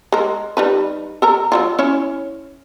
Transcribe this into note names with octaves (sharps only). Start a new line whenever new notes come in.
G#3 A#4
G3 D#4 B4
A4 A#4 A#5
F#3 G3 F4
C#4 E4 C#5